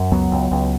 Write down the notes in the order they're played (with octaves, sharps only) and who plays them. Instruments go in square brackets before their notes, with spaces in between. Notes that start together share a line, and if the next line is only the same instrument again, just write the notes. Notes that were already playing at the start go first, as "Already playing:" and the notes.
Already playing: [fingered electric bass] F#2
C#2 F#3 B3
C#2
C#2